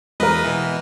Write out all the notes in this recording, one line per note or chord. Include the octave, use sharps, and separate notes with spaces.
E2 G#3 A#4 B4 D#5
B2 E3